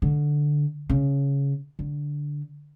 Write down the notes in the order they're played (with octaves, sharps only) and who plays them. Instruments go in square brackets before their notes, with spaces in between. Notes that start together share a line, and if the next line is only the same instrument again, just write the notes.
[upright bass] D3
C#3
D3